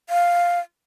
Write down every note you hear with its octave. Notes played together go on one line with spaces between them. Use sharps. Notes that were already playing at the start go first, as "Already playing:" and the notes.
F5